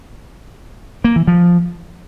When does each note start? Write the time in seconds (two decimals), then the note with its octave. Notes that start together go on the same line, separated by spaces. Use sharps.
1.04 A#3
1.16 E3
1.27 F3